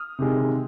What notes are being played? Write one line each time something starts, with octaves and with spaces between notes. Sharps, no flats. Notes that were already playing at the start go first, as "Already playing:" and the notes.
Already playing: D#6 F6
C3 D#3 G#3